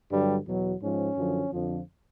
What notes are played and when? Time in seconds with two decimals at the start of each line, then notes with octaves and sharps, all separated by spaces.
0.10 G2 D3 F#3 G3
0.46 E2 B2 F#3
0.81 G#2 F3 C#4
1.17 F#2 D3 F3
1.52 F2 D3 F3